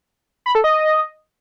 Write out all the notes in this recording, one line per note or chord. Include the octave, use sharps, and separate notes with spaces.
B5
A4
D#5